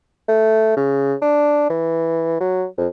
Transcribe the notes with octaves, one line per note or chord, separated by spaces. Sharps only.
A3
C#3
D4
E3
F#3
F2